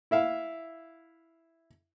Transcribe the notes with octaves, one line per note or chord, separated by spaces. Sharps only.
E4 E5 F5